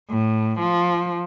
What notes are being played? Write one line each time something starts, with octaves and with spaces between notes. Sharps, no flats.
A2
F3